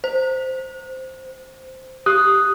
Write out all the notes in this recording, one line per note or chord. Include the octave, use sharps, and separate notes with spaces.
C5
G4 D#6 F#6